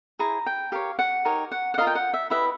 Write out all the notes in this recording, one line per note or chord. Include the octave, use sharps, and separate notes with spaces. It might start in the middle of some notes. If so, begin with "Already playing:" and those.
E4 G#4 C5 A#5
G5
G4 A#4 C#5 F5
F#5
D#4 G4 A#4 C#5
F#5
F#5
F4 A#4 D#5 F5
G5
F#5
E5
E4 G4 B4 D#5 E5